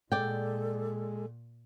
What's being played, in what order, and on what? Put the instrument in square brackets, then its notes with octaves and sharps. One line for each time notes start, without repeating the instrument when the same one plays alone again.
[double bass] A#2 [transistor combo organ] G#3 [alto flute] A4 [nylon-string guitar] D5 G5